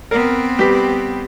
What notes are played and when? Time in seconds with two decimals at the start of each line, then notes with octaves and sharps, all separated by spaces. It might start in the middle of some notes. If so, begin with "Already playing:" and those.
0.11 B3 C4 A#4
0.59 G3 G4 B4 B6